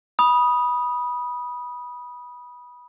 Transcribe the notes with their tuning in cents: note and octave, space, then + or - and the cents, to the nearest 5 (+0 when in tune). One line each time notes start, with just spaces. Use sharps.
B5 -20 D#6 +0